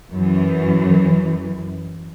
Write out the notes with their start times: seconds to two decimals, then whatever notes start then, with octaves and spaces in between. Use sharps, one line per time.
0.13 F#2 E3